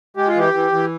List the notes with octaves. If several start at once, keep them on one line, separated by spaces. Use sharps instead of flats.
G#3 G4
F4
E3 G4
E3
E3